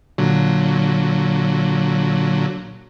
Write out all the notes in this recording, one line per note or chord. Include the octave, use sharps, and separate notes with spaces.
A#2 D3 F#3